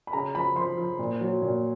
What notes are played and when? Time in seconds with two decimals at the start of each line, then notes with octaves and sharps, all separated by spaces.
0.07 B5
0.13 C#3 A#5
0.34 F3 B5
0.56 F3 C6
0.78 F3
0.99 A#2
1.21 F#3
1.42 A#2